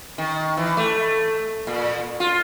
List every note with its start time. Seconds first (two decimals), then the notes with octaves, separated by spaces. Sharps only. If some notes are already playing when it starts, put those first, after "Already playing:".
0.18 D#3
0.57 E3
0.77 A3
1.67 A#2
2.20 F4